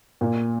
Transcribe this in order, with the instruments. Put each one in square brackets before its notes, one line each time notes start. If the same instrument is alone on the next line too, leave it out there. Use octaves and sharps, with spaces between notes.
[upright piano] A#2